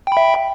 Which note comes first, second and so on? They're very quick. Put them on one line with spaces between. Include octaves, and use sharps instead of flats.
G5 B5 E5